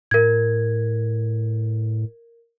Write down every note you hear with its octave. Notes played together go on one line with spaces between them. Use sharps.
A2 A#4 G#6